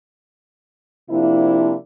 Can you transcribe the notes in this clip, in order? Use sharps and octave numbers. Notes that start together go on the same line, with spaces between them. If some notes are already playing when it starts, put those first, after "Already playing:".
C3 F3 A#3 D4 E4